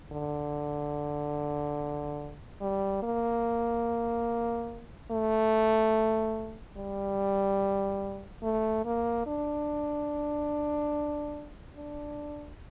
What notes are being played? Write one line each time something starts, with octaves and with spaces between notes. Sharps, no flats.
D3
G3
A#3
A3
G3
A3
A#3
D4
D4